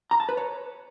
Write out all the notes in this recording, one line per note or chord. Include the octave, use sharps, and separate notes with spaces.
A#5
A5
B4
C#5